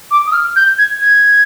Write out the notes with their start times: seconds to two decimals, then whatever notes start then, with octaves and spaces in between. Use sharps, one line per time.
0.11 D6
0.26 D#6
0.32 F6
0.56 G6
0.78 G#6
1.01 G#6